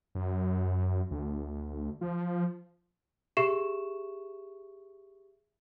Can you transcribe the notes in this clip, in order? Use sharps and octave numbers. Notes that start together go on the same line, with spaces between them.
F#2
D2
F3
G4 G#4 E5 C#6 E7